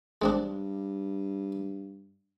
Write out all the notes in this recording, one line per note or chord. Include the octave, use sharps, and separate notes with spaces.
G2 G#3 C4 D4